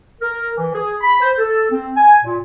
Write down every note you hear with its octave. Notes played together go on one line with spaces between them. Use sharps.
A#4
E3
G#4
B5
C5
A4
C4
G#5
A#2